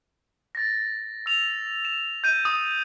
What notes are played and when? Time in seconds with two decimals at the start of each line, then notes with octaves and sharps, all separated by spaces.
0.55 A6 A#6
1.26 E6 F7
1.85 E7
2.24 G6 D#7
2.45 D#6